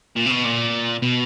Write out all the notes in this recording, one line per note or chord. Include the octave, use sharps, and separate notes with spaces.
A#2
C3
B2
A#2
B2